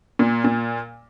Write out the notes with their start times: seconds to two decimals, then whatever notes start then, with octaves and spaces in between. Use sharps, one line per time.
0.19 A#2
0.44 A#2